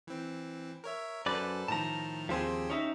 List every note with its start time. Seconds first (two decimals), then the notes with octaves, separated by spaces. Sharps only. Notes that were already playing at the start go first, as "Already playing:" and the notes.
0.07 E3 C4
0.84 A#4 C#5 E5
1.26 F#2 A4 B4 C5 D5
1.68 A2 D#3 F3 A5 A#5
2.29 D#2 F3 C4 G4 G#4 C5
2.70 C#4 D#4 E5